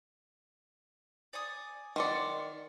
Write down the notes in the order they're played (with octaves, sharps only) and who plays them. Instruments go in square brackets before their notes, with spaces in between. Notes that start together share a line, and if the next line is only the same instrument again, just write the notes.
[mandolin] D5 G#5 D#6
[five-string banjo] D#3 D5 [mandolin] F#5 C6 D6